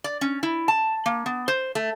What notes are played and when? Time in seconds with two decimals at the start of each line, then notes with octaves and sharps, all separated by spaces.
0.04 D5
0.21 C#4
0.43 E4
0.68 A5
1.06 A#3
1.26 B3
1.48 C5
1.75 A3